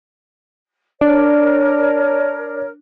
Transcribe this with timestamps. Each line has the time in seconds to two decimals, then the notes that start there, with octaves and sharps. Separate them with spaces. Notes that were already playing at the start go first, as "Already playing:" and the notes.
1.01 D4 A#4 C#5 D5